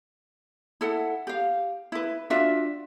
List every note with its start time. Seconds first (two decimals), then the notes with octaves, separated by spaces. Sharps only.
0.81 E4 A4 F#5
1.27 G4 F5
1.92 E4 B4
2.30 D4 F4 F#4 E5